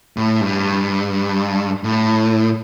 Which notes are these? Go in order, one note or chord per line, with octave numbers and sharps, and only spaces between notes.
A2
G2
A2